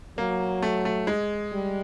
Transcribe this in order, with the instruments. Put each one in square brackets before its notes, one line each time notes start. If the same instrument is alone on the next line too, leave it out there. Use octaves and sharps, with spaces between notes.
[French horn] F#3 [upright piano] A#3
[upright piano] A3
A3
G#3
[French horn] G3